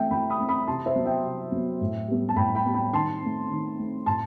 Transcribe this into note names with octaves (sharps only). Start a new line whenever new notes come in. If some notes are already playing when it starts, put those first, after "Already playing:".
Already playing: E3 A3 C4 E5 G5
E3 G5 B5
B5 D#6
A3 C4
B5 D#6
C3 A5 C6
C5 E5
F#3 B3
E5 G5
C3
F#3 B3
A2
G3 B3
A5
A2 G5 B5
G5 B5
G3 B3
G5 B5
D#3 A5 C6
A3 C4
D#3
A3 C4
A2 A5 C6